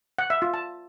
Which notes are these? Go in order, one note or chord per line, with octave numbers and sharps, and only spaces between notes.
F#5
E5
F4
A5